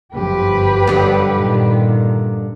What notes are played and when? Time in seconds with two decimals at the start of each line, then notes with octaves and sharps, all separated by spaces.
0.14 G1 F#2 F3 G4 B4
0.87 G2 D3 B3
1.38 A#2 D#3